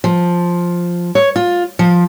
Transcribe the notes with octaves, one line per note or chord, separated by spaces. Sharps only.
F3
C#5
F4
F3